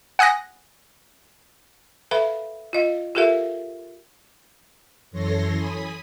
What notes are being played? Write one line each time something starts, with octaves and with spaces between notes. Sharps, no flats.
F#5 G#5 D#6 F#6 A#6
A4 B4 E5 F5 B5
F4 D#5 F5
F4 G4 A4 A#4 E5 F5
F#2 E3 A4 C#5 C6 A#6
G#5 B5 D#6